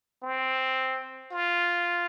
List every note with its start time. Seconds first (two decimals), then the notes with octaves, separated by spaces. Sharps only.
0.23 C4
1.32 F4